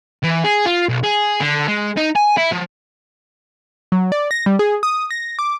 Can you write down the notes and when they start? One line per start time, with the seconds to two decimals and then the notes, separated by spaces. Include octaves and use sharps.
0.23 E3
0.44 G#4
0.66 F4
0.89 B1
1.04 G#4
1.41 D3
1.68 G#3
1.97 D#4
2.16 G#5
2.37 E4
2.52 F3
3.92 F#3
4.12 D5
4.31 A#6
4.46 G3
4.59 G#4
4.83 D#6
5.11 A#6
5.39 D6